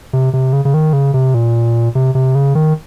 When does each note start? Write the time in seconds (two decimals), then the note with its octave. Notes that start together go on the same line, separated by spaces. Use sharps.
0.13 C3
0.33 C3
0.53 C#3
0.65 C#3
0.74 D#3
0.93 C#3
1.14 C3
1.34 A#2
1.95 C3
2.15 C3
2.35 C#3
2.55 D#3